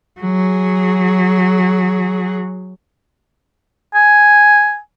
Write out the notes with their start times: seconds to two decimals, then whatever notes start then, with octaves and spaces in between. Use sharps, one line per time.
0.20 F#3 G#4
3.95 G#5